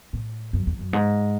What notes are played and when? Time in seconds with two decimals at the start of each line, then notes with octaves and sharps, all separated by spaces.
0.13 A2
0.53 F#2
0.67 E2
0.79 F#2
0.93 G#2